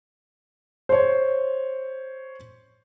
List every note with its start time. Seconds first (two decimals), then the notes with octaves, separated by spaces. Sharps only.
0.89 C5 C#5